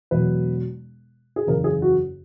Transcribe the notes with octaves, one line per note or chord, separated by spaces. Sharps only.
E1 E2 B2 F#3 B4
G#4
F#1 E2 C#3 A#4
G#4
F#4